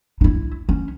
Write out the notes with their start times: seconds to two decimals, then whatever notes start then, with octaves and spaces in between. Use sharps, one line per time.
0.21 D#4 E4
0.69 C#4